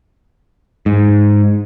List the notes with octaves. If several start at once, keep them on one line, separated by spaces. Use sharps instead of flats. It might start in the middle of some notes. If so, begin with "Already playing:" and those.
G#2